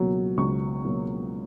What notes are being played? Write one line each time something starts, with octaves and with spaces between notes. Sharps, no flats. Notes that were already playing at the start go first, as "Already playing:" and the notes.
Already playing: C#2 B2 F#3 A#3 C#4
C#2 C#6
B2 F#3 A#3 C#4